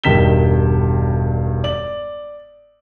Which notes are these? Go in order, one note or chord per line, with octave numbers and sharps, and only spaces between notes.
E1 G2 D#3 B6 E7 G7
D5 F#7